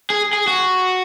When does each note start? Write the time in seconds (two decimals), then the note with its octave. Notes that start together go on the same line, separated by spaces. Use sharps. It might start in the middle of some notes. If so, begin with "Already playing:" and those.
0.10 G#4
0.33 G#4
0.47 F#4